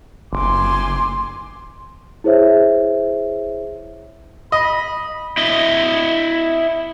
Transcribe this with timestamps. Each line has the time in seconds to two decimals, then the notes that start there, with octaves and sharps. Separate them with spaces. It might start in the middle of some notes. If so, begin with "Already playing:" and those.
0.33 F#1 G#5 C6 D6
2.24 E4 G#4 C5 C#5 E5
4.52 D#5 B5
5.38 E4 D#5